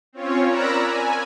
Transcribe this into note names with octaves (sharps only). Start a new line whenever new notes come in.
C4 C#4 F4 C#5
A#4 D5 A#5 B5 E6 F#6
G#5